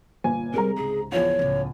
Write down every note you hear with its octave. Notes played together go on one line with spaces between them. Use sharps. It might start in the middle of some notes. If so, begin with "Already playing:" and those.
G1 A#2 G#5
C3 G3 G#3 F4 A#4 A#5
C#2 G#2 G#4
E2 F3 F4 C#5
C#2 A2